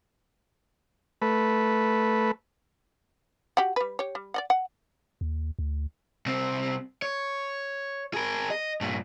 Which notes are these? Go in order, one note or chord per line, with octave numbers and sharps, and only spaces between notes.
A3 B4
F#4 G4 F#5
G3 B4
G4 C#5
G3
D5 D#5 F#5
F#5
D#2
D2
C2 C4
C#5
G#4 A#4
D#5
G2 A#2